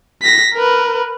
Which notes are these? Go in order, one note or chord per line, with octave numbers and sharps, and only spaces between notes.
A#6 B6
A#4 B4